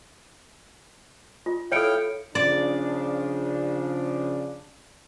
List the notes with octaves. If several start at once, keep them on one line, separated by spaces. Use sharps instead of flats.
F4
E4 A4 C#5 F5 G5 G6 C#7 D7
C#3 F3 D4 D5